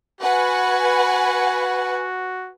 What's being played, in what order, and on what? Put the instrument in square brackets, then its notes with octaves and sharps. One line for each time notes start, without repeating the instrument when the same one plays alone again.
[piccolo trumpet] F#4 [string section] B4 F#5 G#5